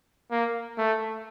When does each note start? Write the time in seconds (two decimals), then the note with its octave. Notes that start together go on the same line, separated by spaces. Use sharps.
0.31 A#3
0.78 A3